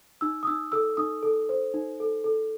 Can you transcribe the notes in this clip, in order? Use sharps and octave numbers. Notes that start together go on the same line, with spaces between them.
D#4 E6
D#6
D#4 E6
A4 E6
D#4 D#6
A4
C5
D#4
A4
A4